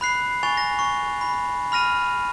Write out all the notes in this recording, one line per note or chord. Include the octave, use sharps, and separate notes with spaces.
B5 F#6 C7
G#5 C#6 A6 F7
A#6
C#6
B5
B5 F6 A#6 D#7 F7